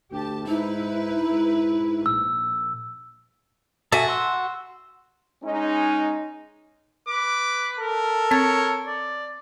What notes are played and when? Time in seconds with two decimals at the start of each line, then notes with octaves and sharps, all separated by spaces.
0.12 D2 G4 A5
0.47 G#2 D#4 E4 B4
1.32 G#2
2.06 A#1 E6
3.92 F#4 A4 E5 G#5
4.08 C6 E6
5.43 G#3 C#4 D#4
7.08 B4 D6
7.79 A4 A#4
8.31 C4 C#5 A6
8.87 D5